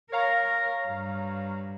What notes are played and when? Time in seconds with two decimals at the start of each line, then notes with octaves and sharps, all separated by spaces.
0.12 A#4 C#5 F5 A#5
0.88 G2